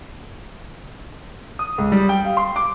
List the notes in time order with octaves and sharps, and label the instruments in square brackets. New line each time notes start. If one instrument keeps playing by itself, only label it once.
[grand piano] D#6
C#2
G3
G5
F5
C6
D6